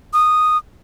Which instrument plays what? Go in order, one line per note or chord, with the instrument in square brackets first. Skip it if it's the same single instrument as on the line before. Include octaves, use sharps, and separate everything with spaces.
[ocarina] D#6